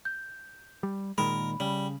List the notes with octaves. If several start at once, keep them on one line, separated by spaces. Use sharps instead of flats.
G6
G3
A#2 D#3 G#3 A#4 B5
C#3 G3